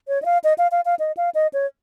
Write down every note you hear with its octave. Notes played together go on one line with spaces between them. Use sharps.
C#5
D#5
F5
D#5
F5
F5
F5
D#5
F5
D#5
C#5